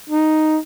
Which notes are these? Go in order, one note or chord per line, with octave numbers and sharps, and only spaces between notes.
D#4